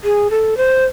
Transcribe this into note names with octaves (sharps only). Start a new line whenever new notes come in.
G#4
A4
C5